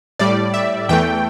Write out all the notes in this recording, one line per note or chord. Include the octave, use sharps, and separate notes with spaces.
A2 G3 D5
E5
E2 E3 A3 G5